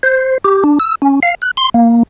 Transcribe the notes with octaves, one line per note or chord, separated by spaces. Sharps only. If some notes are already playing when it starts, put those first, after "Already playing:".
C5
G4
D4
E6
C#4
F5
F#6
C6
A#3